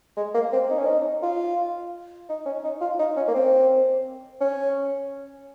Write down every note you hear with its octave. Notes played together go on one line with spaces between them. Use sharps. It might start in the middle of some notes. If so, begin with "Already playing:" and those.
G#3
A#3
C4
D#4
C#4
D#4
F4
D#4
C#4
D#4
F4
D#4
C#4
A#3
C4
C#4